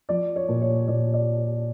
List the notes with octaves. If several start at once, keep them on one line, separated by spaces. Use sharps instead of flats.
F3 D5
C#5
A#2
C#5
A#2 D5
D5